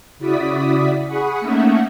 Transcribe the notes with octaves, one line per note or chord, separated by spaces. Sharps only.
C#3 E4 F#4 D5 D#6 B6
G#4 F#5 B5 C#6 D#6
A3 A#3 C#4 D#4 E5 F#5